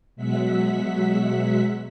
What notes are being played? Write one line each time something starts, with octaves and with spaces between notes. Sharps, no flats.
B2 F#3 G#3 E5 F#5 B6